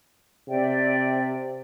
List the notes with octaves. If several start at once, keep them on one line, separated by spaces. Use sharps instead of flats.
C3 D5 E5 G5